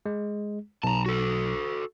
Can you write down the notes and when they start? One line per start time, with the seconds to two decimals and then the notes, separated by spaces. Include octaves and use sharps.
0.06 G#3
0.84 B1 A5 A#5
1.06 F#4 A4